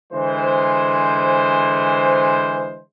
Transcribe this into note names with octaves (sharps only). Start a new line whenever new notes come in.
D3 E3 G#3 C5